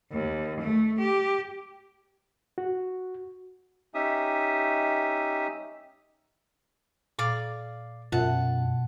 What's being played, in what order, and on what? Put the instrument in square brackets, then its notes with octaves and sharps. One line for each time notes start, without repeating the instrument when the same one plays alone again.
[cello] D#2
A3
G4
[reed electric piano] F#4
[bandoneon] C#4 D#4 G4 E5 D#6
[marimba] A#2 [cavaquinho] D5 F5 D6
[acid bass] F#2 [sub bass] B2 [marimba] F4 E5 [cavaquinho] F#5 A5